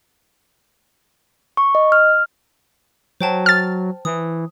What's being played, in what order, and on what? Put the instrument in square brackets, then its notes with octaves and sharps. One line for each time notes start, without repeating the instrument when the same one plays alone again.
[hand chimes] C#6
D#5
F6
[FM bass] F#3 [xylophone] C5 G5 A5
[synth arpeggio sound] F6 A6
[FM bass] E3 [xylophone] D#6